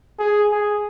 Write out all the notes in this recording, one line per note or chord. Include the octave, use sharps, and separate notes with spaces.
G#4
G#4